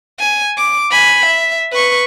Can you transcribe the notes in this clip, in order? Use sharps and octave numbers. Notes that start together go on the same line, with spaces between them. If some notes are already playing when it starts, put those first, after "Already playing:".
G#5
D6
G#5 B5
E5
B4 C#6